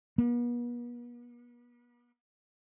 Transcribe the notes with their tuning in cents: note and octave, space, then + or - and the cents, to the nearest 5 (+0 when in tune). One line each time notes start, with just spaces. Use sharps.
B3 -40